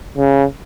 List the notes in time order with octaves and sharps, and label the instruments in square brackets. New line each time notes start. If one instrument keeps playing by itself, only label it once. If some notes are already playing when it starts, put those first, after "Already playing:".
[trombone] C#3